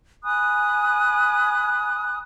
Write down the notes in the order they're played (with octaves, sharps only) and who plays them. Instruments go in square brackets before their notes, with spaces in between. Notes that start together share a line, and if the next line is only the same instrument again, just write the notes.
[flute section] G#5 B5 D#6 F#6